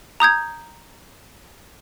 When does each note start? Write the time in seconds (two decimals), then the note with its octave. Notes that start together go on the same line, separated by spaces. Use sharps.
0.20 A#5 D#6 G6 G#6